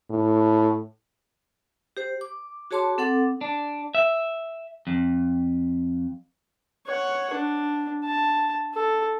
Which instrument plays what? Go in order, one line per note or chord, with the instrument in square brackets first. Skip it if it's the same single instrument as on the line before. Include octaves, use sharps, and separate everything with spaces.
[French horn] A2
[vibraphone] G4 C5
D6
F#4 G#4 C#5 A5 C6 D6
C4 A4 F#5 D6
[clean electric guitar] D4
E5
F2
[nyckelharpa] C#5 F#5
D4
A5
A4